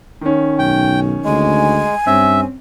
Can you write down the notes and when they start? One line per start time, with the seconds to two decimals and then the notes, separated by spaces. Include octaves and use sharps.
0.21 D#3 C#4
0.59 B1 G5
1.25 D2 G#3 G#5
2.07 G2 C4 C#4 E5